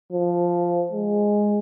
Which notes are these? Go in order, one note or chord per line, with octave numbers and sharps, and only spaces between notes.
F3
G#3